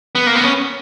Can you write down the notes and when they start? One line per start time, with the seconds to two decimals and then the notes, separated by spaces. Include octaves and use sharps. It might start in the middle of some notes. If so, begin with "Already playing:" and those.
0.15 B3
0.27 A#3
0.35 B3
0.44 C#4